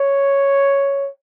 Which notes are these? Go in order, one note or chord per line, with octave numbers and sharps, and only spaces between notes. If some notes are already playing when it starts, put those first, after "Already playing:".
Already playing: C#5